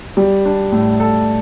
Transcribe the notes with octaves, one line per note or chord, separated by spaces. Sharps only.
G3
D4
A2
A4